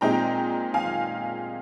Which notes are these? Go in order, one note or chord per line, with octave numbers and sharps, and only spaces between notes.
A#2 G#3 C4 D#4 G5 A#5
F5 G#5